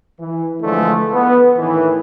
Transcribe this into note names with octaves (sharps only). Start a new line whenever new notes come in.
E3
D3 E3 F3 G#3 A3
B3
A2 D#3 E3